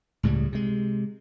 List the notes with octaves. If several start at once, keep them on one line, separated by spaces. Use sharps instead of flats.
C#2 A2 C#3 G3
C3 G#3